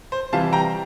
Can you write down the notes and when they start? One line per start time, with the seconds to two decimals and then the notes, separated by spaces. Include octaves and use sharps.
0.12 C5
0.32 C3 E3 G3 F5 A5
0.53 G5 A#5